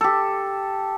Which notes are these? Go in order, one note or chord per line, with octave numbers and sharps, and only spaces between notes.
G4 A4